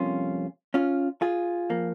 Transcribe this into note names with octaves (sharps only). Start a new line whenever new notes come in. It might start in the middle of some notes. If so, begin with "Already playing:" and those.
Already playing: F2 C3 G3 A#3 C#4 F4
C#4 F4
F4 G#4
F3 A#3